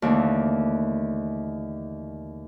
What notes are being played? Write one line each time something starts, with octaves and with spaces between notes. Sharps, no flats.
D#2 D3 E3 A3